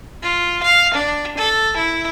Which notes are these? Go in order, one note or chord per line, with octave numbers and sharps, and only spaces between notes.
F4
F5
D4
A4
E4